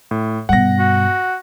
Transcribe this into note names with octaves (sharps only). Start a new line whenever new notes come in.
A2
G2 B2 F#5 A#6
F#4